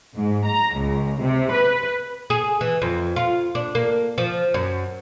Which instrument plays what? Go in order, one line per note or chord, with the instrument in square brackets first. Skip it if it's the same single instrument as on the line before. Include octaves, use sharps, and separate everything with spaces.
[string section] G#2
A#5
C#2
C3
B4
[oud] G#4
E3
F2
F4
D4
A#3
F3
F#2